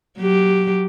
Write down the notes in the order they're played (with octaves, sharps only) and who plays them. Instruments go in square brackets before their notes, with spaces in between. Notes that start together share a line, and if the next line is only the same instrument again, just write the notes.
[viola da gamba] F#3 G4